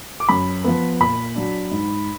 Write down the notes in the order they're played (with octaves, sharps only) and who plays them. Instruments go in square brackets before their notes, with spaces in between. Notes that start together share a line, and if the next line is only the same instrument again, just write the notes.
[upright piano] D6
F#2 B5
F3 B3
A#2 B5
F#3 D4
G#2